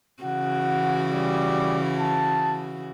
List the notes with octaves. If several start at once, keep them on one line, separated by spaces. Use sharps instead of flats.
C#3 E3 F#4 F#5
G3
A5